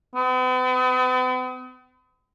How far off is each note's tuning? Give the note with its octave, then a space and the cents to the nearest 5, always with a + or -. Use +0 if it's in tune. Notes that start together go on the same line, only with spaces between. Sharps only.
B3 +45